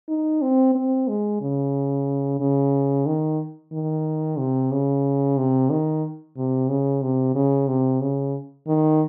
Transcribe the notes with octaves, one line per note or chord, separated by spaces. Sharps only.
D#4
C4
C4
G#3
C#3
C#3
D#3
D#3
C3
C#3
C3
D#3
C3
C#3
C3
C#3
C3
C#3
D#3